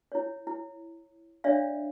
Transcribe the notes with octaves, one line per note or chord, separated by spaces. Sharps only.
E4 C#5
E4
D4 C#5 D5 E5 F5